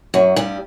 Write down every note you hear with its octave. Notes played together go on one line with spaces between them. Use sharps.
F#2 F#3
G2 G3